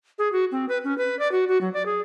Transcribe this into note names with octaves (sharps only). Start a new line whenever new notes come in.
G#4
F#4
C4
B4
C#4
B4
D5
F#4
F#4
F#3
D5
G#4